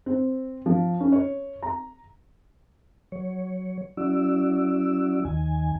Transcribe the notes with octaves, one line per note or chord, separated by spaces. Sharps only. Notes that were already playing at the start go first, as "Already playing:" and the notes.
C4
F3
C#4
C#5
A#5
F#3 C#5
F#3 C#4 E4 F#4 D5 E6
D#2 D#3 G#5